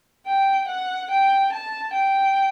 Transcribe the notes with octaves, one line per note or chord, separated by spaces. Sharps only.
G5
F#5
G5
A5
G5